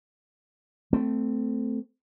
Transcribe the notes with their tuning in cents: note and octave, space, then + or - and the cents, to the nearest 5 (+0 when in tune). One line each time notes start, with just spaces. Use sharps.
A3 +0 C4 -20